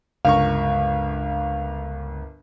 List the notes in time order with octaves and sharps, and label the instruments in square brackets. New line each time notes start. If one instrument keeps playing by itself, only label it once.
[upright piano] G1 A#4 C#6 [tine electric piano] C#2 [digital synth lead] F5